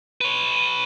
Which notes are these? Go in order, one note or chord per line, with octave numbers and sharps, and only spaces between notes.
B4 C#5